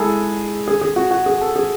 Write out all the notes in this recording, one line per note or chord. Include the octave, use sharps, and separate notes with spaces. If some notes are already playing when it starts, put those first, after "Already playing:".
Already playing: G#3 E4 G#4 A4
G#4
G#4
F#4
F#4
G#4
A4
G#4